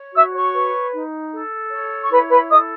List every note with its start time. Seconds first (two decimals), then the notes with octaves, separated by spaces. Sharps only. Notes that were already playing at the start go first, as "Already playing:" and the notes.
Already playing: C#5
0.14 F#4 E5 E6
0.33 C#5 C#6
0.53 B4
0.93 D#4
1.32 A4
1.71 C#5
2.00 C#6
2.10 E4 B4 B5
2.29 B4 B5
2.49 A4 D#5 D#6